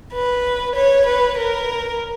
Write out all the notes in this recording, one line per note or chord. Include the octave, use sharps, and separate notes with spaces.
B4
C#5
B4
A#4